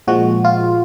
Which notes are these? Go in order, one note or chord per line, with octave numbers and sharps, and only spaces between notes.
A#2 F3 G#3 F#4
F4